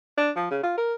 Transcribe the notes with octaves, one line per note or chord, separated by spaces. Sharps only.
D4
F3
C#3
F4
A#4